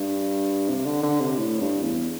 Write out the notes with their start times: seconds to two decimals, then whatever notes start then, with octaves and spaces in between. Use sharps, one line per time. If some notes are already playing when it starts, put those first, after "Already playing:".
Already playing: G2
0.69 C3
0.86 D3
1.03 D3
1.21 C3
1.38 A2
1.61 G2
1.83 E2